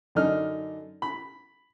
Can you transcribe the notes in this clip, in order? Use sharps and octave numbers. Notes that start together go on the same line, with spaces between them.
F#2 D3 D4 D#4 F6
B5